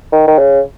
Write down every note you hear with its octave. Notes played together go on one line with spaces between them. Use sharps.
D#3
D#3
C#3